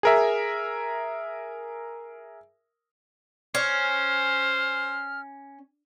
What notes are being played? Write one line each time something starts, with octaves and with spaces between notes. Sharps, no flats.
G#4 A#4 E5
C#4 C5 F6